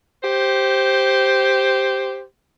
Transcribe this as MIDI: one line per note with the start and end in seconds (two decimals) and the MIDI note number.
0.24 2.23 67
0.24 2.23 72